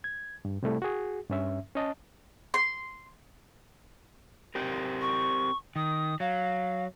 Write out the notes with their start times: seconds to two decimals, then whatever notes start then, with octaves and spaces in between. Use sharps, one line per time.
0.04 G#6
0.45 G2
0.63 C3 G3 A3 E4
0.82 F#4 G#4
1.30 G2 C#4 E5
1.75 C#4 D#5 A5
2.54 C6
4.55 C4 G4 A#4
5.01 C#6
5.76 D#3 D#6
6.20 F#3 F5